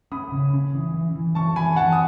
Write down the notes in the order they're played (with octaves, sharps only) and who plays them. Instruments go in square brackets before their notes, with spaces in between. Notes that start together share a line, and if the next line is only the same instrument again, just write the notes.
[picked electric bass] C#4 [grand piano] B5 D#6
[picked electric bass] C#3
C#4
E3
E3
E3
[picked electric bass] E3 [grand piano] A5 C#6
[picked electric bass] E3 [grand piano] G#5 B5
[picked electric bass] E3 [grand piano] F#5 A5
[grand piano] D#6